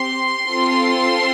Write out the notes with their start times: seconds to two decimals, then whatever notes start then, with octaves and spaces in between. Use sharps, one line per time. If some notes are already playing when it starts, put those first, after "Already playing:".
Already playing: C4 G4 C6
0.49 C4 F4 A4